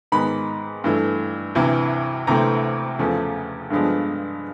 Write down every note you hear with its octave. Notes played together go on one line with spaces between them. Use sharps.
G#2 D#3 G#3 B3 B5
G2 E3 A3
D2 C3 E3
D2 C3 E3 A3 C4 A#5
E2 C#3 F3 A3
G2 D3 F3 G#3 B3